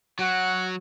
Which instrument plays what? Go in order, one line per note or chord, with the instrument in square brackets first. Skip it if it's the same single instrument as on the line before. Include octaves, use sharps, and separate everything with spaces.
[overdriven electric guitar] F#3 [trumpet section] F#4 F#5